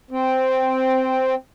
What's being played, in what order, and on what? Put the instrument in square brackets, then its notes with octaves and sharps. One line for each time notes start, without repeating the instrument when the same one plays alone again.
[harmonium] C4